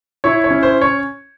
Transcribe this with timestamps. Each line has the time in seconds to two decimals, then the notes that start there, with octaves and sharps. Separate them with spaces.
0.24 E4 C#5
0.44 C#5
0.51 C#4
0.63 C5
0.82 C#5